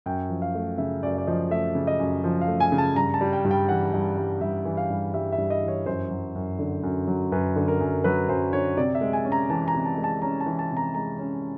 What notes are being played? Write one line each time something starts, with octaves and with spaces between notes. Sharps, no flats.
F#2 G5
F3
F5
A3
C#3 E5
F#2 D5
D5
F3 D#5
A3 E5
C#3
D#5
F#2
F3
F5
A3
G#5
C#3
A5
G2 A#5
A5
G3
G5
G2
G5
E3 F#5
G2
G3
G2 E5
E3
F5
G2
G3 E5
E5
G2
D#5
E3
C#5
F#2 C5
F#3
F#2
D3
F#2
F#3
F#2 B4
D3
A#4
F#2
F#3 B4
F#2 C5
D3 C#5
C3 D5
E5
G#3
G#5
C#4
A#5
E3 A5
A#5
C3
A5
G#3
A5
C#4 A#5
A5
E3
A5
C3
A#5
G#3 A#5
C#4